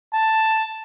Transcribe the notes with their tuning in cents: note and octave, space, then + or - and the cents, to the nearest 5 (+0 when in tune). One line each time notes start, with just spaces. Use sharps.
A5 +5